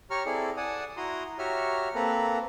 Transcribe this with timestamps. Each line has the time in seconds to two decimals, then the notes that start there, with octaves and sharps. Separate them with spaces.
0.10 G4 C#5 A#5 C#6 F6
0.26 C4 E4 G#4 A4 D5
0.57 D5 F#5 G#5 A5 D#6
0.97 E4 F#4 A#5 C6 D#6
1.39 F#4 G4 C#5 E5 A#5 F6
1.95 A#3 C4 A4 B4 A#5